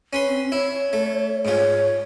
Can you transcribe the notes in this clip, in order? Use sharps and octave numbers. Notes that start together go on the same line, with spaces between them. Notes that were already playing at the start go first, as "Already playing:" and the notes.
C#4 B4 C6
C4
E4 C#5
A3
G#2 F4 C#5